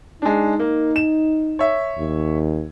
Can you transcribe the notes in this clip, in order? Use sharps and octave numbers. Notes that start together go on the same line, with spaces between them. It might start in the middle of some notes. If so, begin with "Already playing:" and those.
G#3 D4 D#4
A#3
E7
C#5 E5
D#2